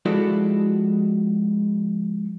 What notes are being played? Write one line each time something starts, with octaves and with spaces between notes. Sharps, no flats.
F3 G#3 E4 F#4 A4 D5